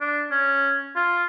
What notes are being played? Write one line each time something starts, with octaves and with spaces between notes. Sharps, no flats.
D4
C#4
F4